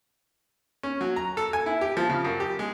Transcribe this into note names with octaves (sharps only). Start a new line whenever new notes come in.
C#4
F#3
A#5
A4
G#5
E4
G4
F3
C#3
F#2
G4
G#3